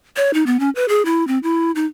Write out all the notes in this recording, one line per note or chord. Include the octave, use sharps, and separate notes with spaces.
C#5
D#4
B3
C#4
B4
G#4
E4
C4
E4
D#4